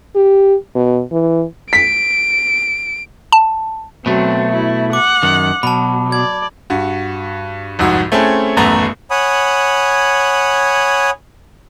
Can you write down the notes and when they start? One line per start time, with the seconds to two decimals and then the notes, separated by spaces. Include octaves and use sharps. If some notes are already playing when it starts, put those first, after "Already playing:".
0.15 G4
0.75 B2
1.12 E3
1.73 B6 D7
3.32 A5
4.06 B2 F#3 A3 C4
4.53 E4
4.93 F#5 D6
5.23 F#2 D#3
5.63 B2 F#3 A5 B5
6.12 D5 G#6
6.70 G2 F#4
7.79 C2 F2 G#2 F#4
8.12 A3 C4 C#4 E4 G#4 A4
8.57 D#1 A1 F#2 A3 B3 A#5
9.11 C#5 F#5 G#5 B5 D#6